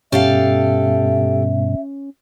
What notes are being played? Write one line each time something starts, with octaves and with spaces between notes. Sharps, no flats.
G2 B2 C#4 G4 A4 E5 F5